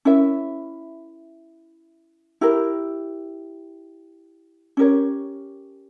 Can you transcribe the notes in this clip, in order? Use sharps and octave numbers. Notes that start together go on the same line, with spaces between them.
C#4 E4 A#4 E5
E4 G4 A#4
C#4 G4 A#4 C#5